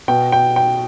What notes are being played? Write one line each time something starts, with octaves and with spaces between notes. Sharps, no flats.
B2 G5
G5
G5